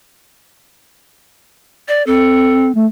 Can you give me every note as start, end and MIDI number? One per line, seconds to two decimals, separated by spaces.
1.88 2.05 74
2.07 2.72 60
2.07 2.67 69
2.75 2.87 57